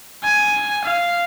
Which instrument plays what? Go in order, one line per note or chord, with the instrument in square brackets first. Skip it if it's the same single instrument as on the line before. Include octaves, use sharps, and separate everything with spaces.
[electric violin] G#5
F5